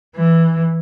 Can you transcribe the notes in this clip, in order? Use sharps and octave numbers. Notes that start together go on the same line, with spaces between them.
E3